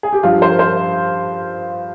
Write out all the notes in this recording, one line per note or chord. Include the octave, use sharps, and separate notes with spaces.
G#4
G4
G2 F3 F4
C5
C5